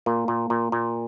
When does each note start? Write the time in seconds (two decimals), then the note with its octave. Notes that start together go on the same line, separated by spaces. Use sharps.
0.06 A#2 A#3
0.28 A#2
0.50 A#2
0.72 A#2